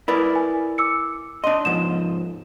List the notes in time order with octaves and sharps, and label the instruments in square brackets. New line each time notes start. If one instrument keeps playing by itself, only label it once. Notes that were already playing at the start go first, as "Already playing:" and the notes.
[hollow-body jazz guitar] E4 A#4 D5 [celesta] B4 B5
[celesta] G#5
D6 E6 C#7
[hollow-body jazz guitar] D4 D#5 [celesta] C6
[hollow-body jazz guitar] G#2 F3 [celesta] E7